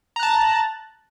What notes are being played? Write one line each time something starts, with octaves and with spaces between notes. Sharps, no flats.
A5 A#5 F#6